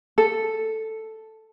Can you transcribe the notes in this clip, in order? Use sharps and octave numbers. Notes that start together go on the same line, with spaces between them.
A4